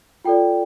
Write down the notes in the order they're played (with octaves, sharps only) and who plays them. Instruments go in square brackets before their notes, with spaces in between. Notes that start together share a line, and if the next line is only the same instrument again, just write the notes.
[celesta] F4 A4 D5 G5